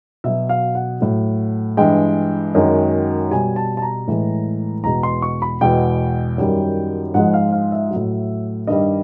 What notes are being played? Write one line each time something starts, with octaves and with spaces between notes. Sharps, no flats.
B2 F#3 E5
F5
F#5
A2 F#3
G2 E3 G#3 G5
F#2 D#3 G#3
B2 G3 G#5
A5
A5
A#5
A2 E3 G#3
E2 B2 G#3 A#5
C6
C#6
B5
E2 B2 G#3 G5
F#2 D#3 G3
G#2 F3 G#3 F#5
F5
F5
E5
F#3
A2
G2 D#3 G3 D#5